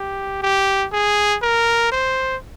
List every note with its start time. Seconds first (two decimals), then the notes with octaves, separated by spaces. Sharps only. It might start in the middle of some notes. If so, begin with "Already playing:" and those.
Already playing: G4
0.43 G4
0.93 G#4
1.43 A#4
1.92 C5